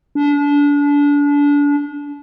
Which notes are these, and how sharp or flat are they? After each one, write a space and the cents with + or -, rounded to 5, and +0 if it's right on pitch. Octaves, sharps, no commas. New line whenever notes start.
D4 -30